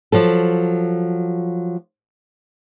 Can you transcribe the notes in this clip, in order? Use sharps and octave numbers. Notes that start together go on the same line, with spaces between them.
F3 F#3 A4